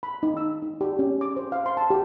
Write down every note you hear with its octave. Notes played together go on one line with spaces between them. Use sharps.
B5
D#4
E6
D#4
G4
C#4
D6
C5
F5
C6
A5
G4